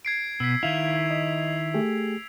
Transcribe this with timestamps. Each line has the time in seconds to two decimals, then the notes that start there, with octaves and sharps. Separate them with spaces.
0.05 G#6 C7 D7
0.40 B2 E6 B6
0.63 D#3 E4 F5 F7
1.11 D#5
1.74 A3 G4 G#4